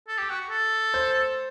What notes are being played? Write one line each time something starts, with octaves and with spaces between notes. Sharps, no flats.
A4
G4
F#4
A4
C5